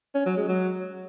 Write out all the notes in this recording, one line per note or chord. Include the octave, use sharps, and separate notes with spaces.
C#4
F#3
G#3
F#3